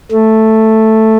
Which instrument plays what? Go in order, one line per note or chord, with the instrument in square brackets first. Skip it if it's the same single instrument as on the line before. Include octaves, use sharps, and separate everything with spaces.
[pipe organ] A3